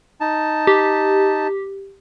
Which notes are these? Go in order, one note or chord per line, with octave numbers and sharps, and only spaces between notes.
D#4 A5
G4